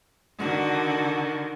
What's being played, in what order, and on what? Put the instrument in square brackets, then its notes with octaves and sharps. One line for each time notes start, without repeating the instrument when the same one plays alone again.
[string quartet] D3 D#3 F#4